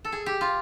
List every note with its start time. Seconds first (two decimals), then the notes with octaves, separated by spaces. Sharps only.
0.05 A4
0.12 G#4
0.26 G4
0.41 F4